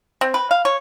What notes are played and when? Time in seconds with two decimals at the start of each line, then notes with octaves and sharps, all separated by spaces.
0.21 C4
0.34 B4
0.51 F5
0.65 C#5